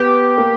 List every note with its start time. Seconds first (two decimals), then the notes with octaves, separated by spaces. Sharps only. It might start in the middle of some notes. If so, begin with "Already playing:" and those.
Already playing: B3 G4
0.38 A#3